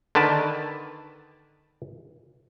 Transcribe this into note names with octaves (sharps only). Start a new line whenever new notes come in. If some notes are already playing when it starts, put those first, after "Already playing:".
D3 D#3 B4 D5 A5